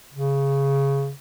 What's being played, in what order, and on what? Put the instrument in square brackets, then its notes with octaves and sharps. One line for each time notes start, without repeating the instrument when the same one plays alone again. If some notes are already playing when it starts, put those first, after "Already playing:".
[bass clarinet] C#3